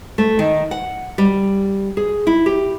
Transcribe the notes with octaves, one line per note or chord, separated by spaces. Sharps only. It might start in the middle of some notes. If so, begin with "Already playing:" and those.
A3
D#3
F#5
G3
G#4
E4
G4